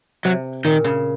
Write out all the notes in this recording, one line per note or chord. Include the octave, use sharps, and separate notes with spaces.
C3 F#3
A#2 D#3
C#3